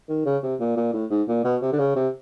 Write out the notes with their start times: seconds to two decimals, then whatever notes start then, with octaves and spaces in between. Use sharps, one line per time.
0.09 D#3
0.26 C#3
0.43 C3
0.60 A#2
0.77 A#2
0.93 A2
1.11 G#2
1.28 A#2
1.44 B2
1.62 C3
1.72 D3
1.79 C#3
1.96 C3